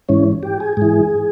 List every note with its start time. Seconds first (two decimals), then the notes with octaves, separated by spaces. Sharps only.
0.09 G#2 E3 C#4
0.43 G4
0.60 G#4
0.77 G#2 E3 G#4